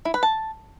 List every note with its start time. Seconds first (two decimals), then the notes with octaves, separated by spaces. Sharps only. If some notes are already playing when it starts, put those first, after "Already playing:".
0.05 E4
0.14 B4
0.23 A5